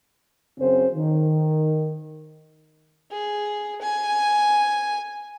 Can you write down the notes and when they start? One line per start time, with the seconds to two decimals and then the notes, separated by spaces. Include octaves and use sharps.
0.59 F#2 C#3 C4 C#4 C5
0.95 D#3
3.11 G#4
3.82 G#5